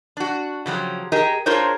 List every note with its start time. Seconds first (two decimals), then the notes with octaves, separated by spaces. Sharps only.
0.17 D4 F#4
0.66 C#3 F3 F#3 G4
1.12 G4 G#4 A#4 D#5
1.46 D4 F4 G#4 A#4 C5 C#5